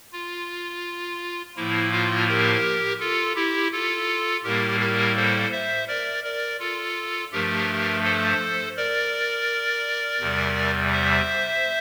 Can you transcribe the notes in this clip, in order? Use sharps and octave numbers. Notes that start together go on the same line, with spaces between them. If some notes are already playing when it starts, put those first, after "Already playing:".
F4
A2 F3 A#3 E4
F4
G4 A#4
F4 A4
E4 G4
F4 A4
A2 G3 A#3 G4 A#4
G4 A#4
A4 C5
C5 E5
A#4 D5
A#4 D5
F4 A4
G2 F3 A3 G4 A#4
A4 C5
A#4 D5
E2 C3 G3
C5 E5